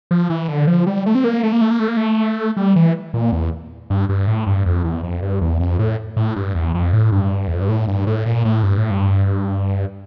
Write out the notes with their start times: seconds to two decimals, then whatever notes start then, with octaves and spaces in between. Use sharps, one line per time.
0.11 F3
0.30 E3
0.48 D3
0.67 F3
0.86 G3
1.06 A3
1.15 C4
1.24 A#3
1.43 A3
1.53 A#3
1.61 A3
1.71 A#3
1.79 A3
1.88 A#3
1.97 A3
2.57 G3
2.76 E3
3.14 A#2
3.32 E2
3.90 G2
4.09 G2
4.27 A2
4.47 G2
4.65 F2
4.84 E2
5.03 F2
5.22 G2
5.41 E2
5.60 F2
5.79 A2
6.17 A2
6.36 G2
6.55 E2
6.74 F2
6.93 A2
7.12 G2
7.48 E2
7.54 F2
7.61 G2
7.69 A2
7.87 G2
8.07 A2
8.26 A#2
8.45 A2
8.63 G2
8.77 A2
8.91 G2